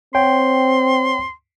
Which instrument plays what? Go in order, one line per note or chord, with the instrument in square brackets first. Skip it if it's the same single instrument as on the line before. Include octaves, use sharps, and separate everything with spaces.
[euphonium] C4 [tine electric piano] C#5 F#5 G5 [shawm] C6